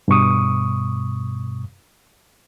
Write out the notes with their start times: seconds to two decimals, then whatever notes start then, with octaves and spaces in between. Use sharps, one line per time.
0.08 G2 B2 C#6 D#6